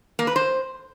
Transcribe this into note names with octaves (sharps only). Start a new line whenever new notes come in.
A#3
B4
C5